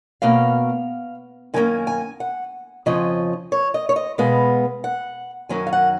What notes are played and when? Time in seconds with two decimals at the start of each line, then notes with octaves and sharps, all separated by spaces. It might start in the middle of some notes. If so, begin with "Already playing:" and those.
0.22 B2 A#3 C#4 F5
1.54 F#2 D#3 A#3 C#4 G#5
1.87 G#5
2.20 F#5
2.86 F2 C#3 F3 C#4 D#5
3.52 C#5
3.74 D#5
3.89 C#5
3.96 D#5
4.18 B2 G#3 B3 F5
4.84 F#5
5.49 F#2 D#3 F#3 C#4 G#5
5.67 F5
5.73 F#5